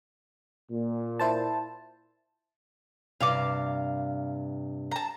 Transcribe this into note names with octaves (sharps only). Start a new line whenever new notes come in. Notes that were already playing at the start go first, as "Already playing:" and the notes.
A#2
E4 C5 A5
G2 C3 F5 D6
A5 A#5